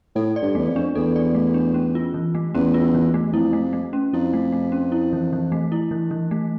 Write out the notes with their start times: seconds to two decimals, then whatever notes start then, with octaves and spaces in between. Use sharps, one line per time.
0.15 A2 A4
0.36 D5
0.42 G2
0.55 E2 A3
0.68 F2
0.76 D4
0.95 E2 A4
1.16 D5
1.34 A3
1.54 D4
1.74 C#4
1.95 F4
2.14 E3
2.35 A3
2.54 E2 C#4
2.74 F4
2.94 E3
3.14 A3
3.33 F2 E4
3.53 A3
3.73 A3
3.93 C#4
4.13 F2 E4
4.33 A3
4.53 A3
4.72 C#4
4.92 E4
5.13 E3
5.33 E3
5.52 A3
5.72 E4
5.91 E3
6.11 E3
6.31 A3